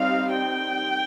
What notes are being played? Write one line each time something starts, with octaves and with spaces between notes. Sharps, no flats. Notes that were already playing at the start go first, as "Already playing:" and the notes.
Already playing: G3 C4 D#4 F5
G5